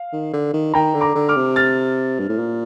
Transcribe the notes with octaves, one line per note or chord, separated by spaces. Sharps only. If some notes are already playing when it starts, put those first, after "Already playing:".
Already playing: F5
D#3
D3
D#3
D#3 G5 A#5
D3
A#5 D6
D3
D6 F6
C3
F6 A6
G2
A2
A#2